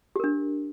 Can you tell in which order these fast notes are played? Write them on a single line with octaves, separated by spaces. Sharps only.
G4 A#4 D4